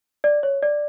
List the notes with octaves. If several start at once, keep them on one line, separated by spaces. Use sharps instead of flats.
D5
C#5
D5